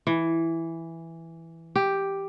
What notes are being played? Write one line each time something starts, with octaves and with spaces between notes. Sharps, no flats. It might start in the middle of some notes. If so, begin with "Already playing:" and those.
E3
G4